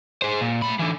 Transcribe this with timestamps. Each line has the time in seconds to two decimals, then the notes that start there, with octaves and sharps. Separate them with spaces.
0.22 G#4 C5
0.41 A#2
0.62 A3 B5
0.79 D3 E3